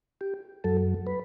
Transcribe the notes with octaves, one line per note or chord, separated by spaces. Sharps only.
G4
F#2 F#3 A4
B4